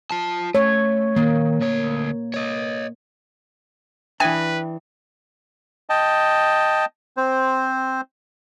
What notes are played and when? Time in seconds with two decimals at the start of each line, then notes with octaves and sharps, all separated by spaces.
0.11 F4 A5
0.55 A3 C#5
1.16 D#3 A#3
1.61 D2 C#5
2.34 C#5 D#5
4.20 E3 D4 B4 E5 G5 G#5 D#6
5.90 D#5 G5 A5
7.17 C4 C5